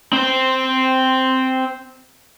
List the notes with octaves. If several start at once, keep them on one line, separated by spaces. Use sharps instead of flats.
C4 C5